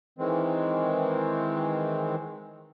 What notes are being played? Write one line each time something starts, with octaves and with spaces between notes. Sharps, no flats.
D#3 E3 G#3 C4